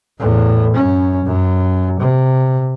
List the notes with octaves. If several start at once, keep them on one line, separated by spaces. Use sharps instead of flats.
E2 A2
F#2 C#4
F#2
C3